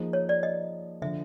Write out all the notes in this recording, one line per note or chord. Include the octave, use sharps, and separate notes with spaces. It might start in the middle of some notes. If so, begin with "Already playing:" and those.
Already playing: F3 A#3 D#4 G#4
C#5
D5
D#5
D3 F3 E5